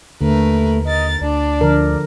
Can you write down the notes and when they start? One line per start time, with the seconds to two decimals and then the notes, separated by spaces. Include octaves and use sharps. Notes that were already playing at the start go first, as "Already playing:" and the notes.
0.21 D#2 D3 A3 A#4 B4
0.85 A#4 D#5 A6
1.21 D2 D4 D5
1.61 D3 F3 A#4